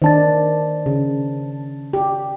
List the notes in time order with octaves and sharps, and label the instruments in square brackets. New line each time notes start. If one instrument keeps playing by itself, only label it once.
[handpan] D#3 D4 [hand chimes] C5 A5 A6
[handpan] C#3
G4